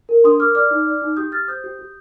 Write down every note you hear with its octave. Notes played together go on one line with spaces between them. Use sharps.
A#4
D4 C6 D#6
A#4 D6 F6
D5 D6 F6
D#4
D5
D#4
G4 D#6 G6
G4 F6 A6
C5 D#6 G6
G4
G4